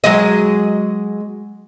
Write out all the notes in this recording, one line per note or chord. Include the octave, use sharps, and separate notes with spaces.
F#3 G#3 D#5